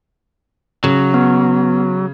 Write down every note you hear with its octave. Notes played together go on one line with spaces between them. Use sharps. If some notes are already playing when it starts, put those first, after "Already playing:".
C#3 F#3
B3